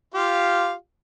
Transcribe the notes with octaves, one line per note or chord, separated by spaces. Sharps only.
F4 G4 F5